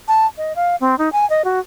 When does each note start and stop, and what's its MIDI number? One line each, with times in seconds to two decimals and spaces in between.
0.08 0.27 81
0.38 0.53 75
0.56 0.76 77
0.81 0.98 60
0.98 1.12 63
1.12 1.28 80
1.30 1.42 75
1.45 1.59 66